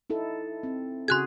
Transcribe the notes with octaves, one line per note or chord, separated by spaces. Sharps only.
D#4 E4 A4
C4
C#3 F#4 G#4 C6 F#6 G#6